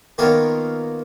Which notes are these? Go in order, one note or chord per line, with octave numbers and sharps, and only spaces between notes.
D#3 A#3 B3 F4 C#5